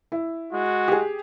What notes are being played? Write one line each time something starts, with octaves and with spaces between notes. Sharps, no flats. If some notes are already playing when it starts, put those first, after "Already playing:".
E4
G#3 F#4
G4 G#4